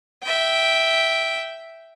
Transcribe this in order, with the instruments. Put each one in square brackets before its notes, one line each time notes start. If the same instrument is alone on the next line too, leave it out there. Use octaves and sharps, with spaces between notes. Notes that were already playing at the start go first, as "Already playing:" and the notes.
[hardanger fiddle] E5 G5